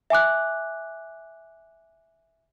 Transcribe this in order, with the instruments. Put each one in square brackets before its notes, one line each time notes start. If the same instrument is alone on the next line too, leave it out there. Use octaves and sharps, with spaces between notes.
[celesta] E5 G#5 D6 F#6